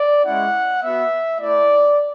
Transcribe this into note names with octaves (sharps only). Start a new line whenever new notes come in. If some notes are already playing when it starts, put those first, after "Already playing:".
Already playing: D5
G#3 C#4 E4 F#5
B3 F#4 E5
A3 E4 D5